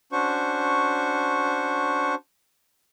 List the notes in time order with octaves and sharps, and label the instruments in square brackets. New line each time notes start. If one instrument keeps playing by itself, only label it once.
[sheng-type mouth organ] C#4 D4 F#4 C5 C#6